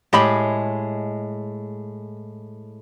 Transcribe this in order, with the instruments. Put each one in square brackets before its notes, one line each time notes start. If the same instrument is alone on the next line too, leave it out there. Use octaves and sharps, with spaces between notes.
[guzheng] A2 G#3 [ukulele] G4 D#5 B5